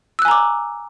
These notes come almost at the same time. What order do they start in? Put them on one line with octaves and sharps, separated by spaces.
E6 F#6 G#5 A#5 D6